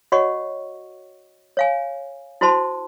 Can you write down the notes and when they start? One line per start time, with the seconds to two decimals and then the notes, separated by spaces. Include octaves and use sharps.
0.12 F#4 C#5 D#5 F#5 C#6
1.57 C#5 F5 G#5
2.41 E4 F#4 C5 A5 C6